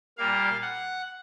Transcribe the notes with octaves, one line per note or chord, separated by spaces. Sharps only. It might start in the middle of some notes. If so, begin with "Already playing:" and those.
A#2 G3 A#3 F5
F#5